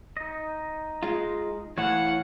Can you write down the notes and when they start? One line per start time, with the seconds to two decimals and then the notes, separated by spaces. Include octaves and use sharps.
0.17 D#4 D#5
1.03 G#3 F4
1.78 A2 E3 C#5 F5 F#5